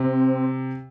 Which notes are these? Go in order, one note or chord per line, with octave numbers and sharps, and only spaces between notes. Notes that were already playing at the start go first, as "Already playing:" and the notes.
Already playing: C3 C4